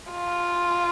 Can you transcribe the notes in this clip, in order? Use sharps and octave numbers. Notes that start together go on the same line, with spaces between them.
F4